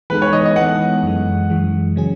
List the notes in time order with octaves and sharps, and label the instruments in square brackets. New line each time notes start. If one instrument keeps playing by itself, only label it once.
[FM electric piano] E3 G#3 B3 D#4 A4 [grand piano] B4
[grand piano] C#5
D#5
D#5
[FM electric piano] E3 G#3 B3 D#4 A4 [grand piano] F#5
[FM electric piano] F#2 E3 G#3
F#2 E3 G#3
C#3 F#3 C#4 G#4